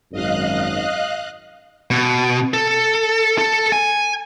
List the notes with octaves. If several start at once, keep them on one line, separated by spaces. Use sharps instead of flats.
G#1 F#2 D#5 F5 F#6
B2
A4
A4
G#5